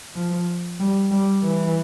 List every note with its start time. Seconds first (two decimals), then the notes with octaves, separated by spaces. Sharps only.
0.15 F3
0.79 G3
1.11 G3
1.43 E3